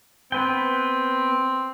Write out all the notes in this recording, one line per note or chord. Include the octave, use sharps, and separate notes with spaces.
B3 C4 B4 G5